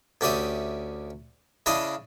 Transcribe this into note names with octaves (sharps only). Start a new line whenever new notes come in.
D2 C#4 G4 D5 E5 D#6
C#3 D4 E4 D#5 F5 D#6